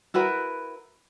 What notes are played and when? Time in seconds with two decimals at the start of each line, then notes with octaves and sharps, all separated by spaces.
0.14 E4 F#4 A#4 B4